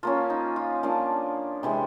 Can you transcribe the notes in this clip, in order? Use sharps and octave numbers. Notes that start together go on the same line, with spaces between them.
F3 A#3 C#4 F4
D#4
F4
F3 A#3 D4
C3 E3 G#3